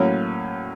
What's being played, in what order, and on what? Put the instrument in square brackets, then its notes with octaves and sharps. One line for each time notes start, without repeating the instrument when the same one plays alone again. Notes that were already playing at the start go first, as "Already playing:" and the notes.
Already playing: [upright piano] A2 F#3 A#3 C#4